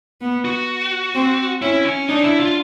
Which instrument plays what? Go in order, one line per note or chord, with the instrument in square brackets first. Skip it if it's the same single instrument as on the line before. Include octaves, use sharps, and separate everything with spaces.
[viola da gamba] B3
[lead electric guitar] F#4
[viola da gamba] C4
[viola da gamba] C#4 [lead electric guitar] E4
[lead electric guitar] C#4
[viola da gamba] D4 [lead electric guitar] D#4
[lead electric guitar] E4
F4